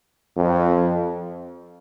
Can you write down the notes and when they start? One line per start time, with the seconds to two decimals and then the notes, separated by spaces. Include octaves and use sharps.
0.37 F2